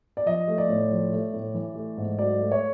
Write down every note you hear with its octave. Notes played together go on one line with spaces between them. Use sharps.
D5
F3 D#5
A3
D5
A2
F3
A3
A2
E3
A3
G#2
F#3 D5
A3
C#5